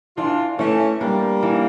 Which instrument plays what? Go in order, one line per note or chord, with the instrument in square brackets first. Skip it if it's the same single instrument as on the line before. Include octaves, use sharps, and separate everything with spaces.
[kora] E3 [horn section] D4 F4
[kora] E3 [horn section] A3 C#4
[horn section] G3 A#3 [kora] D4
[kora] E3